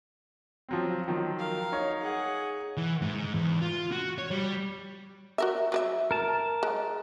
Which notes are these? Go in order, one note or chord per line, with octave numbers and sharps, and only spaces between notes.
F3 F#3 C4
D#3 F3 F#3
A#4 F5
D#4 C#5
G#4 F#5
E3
G#2
E2
F4
F#4
C#5
G3
F#4 A#4 E5
F#3 B4 E5
A#4 A5
G#3